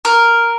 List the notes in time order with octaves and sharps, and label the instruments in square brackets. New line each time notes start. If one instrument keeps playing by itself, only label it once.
[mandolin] A#4